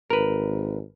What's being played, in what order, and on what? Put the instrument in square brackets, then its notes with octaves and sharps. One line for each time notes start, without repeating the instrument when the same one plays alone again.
[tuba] G#1 [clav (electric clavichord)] A#4 B4